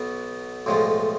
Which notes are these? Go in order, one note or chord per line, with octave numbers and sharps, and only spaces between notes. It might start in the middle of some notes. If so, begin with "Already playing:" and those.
Already playing: B1 B2 B3
B1 A2 F3 G#3